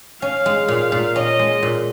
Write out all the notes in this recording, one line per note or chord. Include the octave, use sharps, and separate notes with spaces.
C#4 F5
G#3
A#2
A#2
C#4 D#5
G#3
A#2